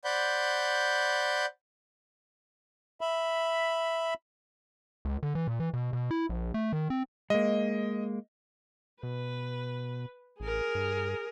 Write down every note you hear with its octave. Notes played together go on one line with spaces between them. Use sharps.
C5 D5 F#5 B5 G6
E5 B5
C#2
D3
E3
A#2
E3
B2
B2
E4
A#1
A3
D#3
C4
G#3 A#3 D#5
B2 B4
A1 G#4 A#4
G2